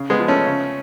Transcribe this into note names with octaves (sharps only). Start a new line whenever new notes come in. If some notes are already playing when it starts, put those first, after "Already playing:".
Already playing: C#3
G#3 B3
F3
A3 C#4
C#3